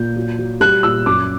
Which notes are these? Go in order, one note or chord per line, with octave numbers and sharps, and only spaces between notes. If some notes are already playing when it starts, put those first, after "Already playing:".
Already playing: A#2 G6
F#3
F#3
G3 F#6
A#2 E6
F#2 D6